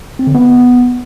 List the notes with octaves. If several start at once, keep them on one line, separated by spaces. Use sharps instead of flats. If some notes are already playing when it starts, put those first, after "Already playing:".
C4
D3
B3